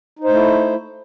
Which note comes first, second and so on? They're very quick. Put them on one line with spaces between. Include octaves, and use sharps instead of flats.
D#4 C5 A3 E4